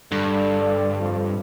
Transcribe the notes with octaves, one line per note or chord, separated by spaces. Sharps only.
G2 D3
F2